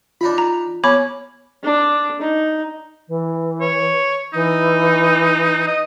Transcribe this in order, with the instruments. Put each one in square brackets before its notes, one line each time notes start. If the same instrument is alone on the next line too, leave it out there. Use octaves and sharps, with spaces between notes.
[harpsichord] D4 D#4 B5 [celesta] F4
[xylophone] A#5
[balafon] B3 [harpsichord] C#4 [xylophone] B5 D6
[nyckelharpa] D4
D#4
[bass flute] E3
[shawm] C#5
[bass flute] E3 [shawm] D#4
[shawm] D#5